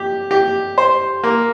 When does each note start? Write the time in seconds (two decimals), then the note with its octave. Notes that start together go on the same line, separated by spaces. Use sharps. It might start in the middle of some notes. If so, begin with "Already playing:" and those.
Already playing: G4
0.31 G4
0.78 C5
1.23 A#3